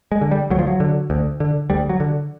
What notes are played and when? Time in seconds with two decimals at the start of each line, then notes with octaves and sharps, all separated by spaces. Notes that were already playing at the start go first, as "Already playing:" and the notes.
0.12 G#3
0.21 D3
0.31 G3
0.50 D2 F#3
0.59 F3
0.67 F#3
0.80 D3
1.10 D2
1.40 D3
1.70 D2 G3
1.89 F#3
2.00 D3